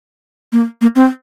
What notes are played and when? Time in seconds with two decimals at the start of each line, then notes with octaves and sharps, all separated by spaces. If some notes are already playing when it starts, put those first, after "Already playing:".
0.52 A#3
0.81 A#3
0.96 C4